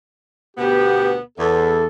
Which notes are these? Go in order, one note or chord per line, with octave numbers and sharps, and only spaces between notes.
D2 B2 B3 G4
E2 A4